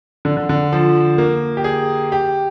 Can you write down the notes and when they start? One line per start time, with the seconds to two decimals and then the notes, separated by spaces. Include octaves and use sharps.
0.25 D3
0.37 D3
0.49 D3
0.73 F3
1.18 A#3
1.57 G4
1.64 G#4
2.12 G4